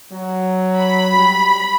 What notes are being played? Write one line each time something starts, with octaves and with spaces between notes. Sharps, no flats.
F#3
B5
G3